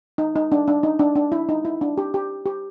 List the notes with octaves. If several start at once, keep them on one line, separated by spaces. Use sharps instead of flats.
D#4
D#4
D4
D4
D#4
D4
D4
E4
D#4
E4
D4
G4
G4
G4